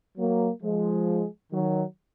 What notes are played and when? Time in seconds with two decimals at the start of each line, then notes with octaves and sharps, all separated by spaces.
0.18 F#3 A#3
0.63 F3 G#3
1.52 D#3 F#3